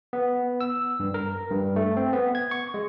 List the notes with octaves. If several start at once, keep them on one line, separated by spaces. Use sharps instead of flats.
B3
E6
G2
A#4
G2
A3
C4
B3
G#6
C#6
G#3